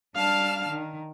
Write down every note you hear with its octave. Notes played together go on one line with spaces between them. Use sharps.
G3 D4 F5 A5 F6
D#3